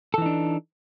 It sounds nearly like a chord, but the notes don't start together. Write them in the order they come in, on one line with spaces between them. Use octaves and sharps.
A4 E3 D#4 D4